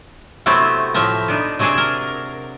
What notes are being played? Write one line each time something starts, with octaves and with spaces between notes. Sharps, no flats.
C3 F#3 A3 B3 C4 E4
A2 F3 E5 A#5
B3 D4 D#4
C3 F#3 D4 G#4 A4
A#4